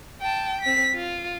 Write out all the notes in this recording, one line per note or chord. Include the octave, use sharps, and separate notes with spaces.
G5 A5
C4 B6
F4